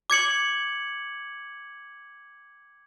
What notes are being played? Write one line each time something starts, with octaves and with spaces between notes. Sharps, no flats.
D6 G#6 C#7 F#7